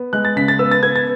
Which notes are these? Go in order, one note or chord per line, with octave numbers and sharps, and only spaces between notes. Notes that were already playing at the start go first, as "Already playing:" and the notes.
Already playing: B3
G#3 F#6
A6
C#3 B6
A6
B3 E6
A6
B3 G#6
A6